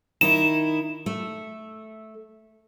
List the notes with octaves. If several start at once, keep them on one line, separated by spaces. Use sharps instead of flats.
D#3 D#4 E4 E7
A3